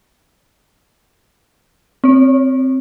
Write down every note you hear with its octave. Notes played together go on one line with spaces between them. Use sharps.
C4 C#5